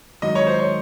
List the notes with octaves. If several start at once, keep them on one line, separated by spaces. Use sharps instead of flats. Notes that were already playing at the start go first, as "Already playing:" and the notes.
G#2 D#3 F#3 D#5
C#5
C5
C#5